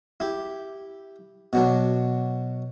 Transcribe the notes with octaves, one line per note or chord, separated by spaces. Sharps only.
E4 G4
B2 F#3 D4